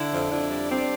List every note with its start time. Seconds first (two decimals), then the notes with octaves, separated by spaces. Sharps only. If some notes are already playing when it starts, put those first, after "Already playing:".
Already playing: D3 D4 E4
0.12 F2
0.31 F2 D4 E4
0.50 G3
0.71 G3 C4 D4